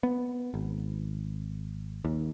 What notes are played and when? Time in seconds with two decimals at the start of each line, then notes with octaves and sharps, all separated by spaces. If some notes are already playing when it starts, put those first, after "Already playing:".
0.03 B3
0.54 G#1
2.05 D#2